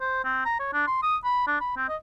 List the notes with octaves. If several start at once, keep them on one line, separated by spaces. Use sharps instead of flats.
C5
C4
A#5
C#5
D4
C6
D#6
B5
D4
B5
C4
D#5